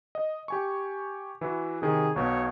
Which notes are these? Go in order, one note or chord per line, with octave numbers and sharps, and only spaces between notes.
D#5
G4 G#5 C#6
E3 E4 F#4
C3 D#3 G#4
B1 B2 C#5